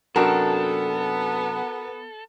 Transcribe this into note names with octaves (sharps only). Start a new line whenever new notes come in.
F#2 C3 B3 D4 F#4 A4 A#4